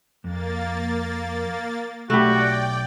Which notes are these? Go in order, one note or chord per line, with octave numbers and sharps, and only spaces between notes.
F2 A#3 A6
B1 A3 F#4 G4 D5 G5 B5